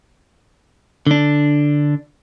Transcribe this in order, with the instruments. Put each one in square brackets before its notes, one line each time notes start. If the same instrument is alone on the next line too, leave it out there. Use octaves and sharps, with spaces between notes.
[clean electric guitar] D3 D4